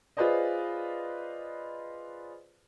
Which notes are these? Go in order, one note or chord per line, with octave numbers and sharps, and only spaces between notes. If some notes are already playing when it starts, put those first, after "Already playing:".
F4 G#4 B4 C5 D5 D#5